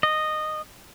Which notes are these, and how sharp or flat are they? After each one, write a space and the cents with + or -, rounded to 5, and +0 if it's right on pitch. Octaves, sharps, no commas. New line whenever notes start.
D#5 -10